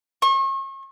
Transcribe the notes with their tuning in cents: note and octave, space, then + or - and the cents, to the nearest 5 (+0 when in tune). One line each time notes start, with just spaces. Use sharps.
C#6 -40